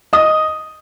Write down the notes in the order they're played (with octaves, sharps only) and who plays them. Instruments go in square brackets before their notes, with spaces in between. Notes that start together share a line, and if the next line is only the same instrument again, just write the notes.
[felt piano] D#5 D#6